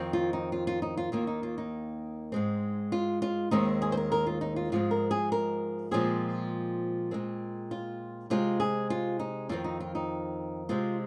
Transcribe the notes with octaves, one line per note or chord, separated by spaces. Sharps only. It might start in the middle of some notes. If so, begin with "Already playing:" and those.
Already playing: F2 D#3 C4
F4
D#4
F4
F4
D#4
F4
D#2 D#3 A#3 F4
D#4
F4
D#4
G#2 G#3 C4
F4
F4
D#2 D#3 G#3 C4 D#4
G#4
C5
A#4
A#4
F4
D#4
F4
G#2 F3 G#3 C4 F4
A#4
G#4
A#4
A#2 F3 G#3 C4 G#4
A#2 G#3 C4
F4
C3 G#3 C4 F4
G#4
F4
D#4
F2 D#3 C4 F4
D#4
F4
D#4
C3 G#3 C4 F4